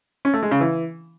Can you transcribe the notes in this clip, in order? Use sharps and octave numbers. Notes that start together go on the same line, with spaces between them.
C#4
A3
G#3
C#3
E3